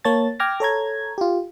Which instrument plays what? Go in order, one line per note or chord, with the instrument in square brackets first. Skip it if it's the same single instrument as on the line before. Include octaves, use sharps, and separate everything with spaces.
[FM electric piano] A#3 C#5 A5 A6
G5 D6 F6 G#6 A#6
A4 C#5 A#5 G#6
F4 G4